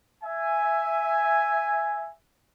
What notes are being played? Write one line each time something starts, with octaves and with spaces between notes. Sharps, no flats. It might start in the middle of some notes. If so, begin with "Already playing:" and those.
E5 G#5